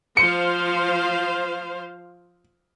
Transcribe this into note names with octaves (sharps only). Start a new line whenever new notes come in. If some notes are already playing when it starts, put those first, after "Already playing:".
F3 C5 F5 C#7